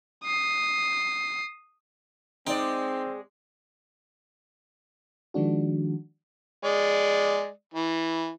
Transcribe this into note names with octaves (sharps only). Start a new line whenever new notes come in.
D#6 C7
G#3 C4 D#4 D5 G5
D#3 F3 G#3 D4 F#4
G#3 D5
E3